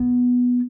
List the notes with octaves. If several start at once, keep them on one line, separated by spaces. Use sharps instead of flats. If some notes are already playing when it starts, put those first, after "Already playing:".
Already playing: B3